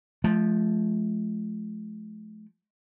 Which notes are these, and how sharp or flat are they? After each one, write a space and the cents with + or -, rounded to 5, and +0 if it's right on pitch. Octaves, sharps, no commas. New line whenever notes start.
F3 +0 A3 -45